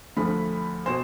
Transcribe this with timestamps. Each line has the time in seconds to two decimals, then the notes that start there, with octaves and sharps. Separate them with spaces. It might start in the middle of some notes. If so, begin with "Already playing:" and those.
0.16 D2 D3 F3 A3 B5
0.86 B2 C5